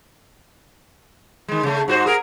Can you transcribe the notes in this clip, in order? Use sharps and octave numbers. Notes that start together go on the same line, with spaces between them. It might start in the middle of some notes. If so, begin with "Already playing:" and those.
D#3 G#3
C#3 A3
G#2 F#4 C5
G#4 A#4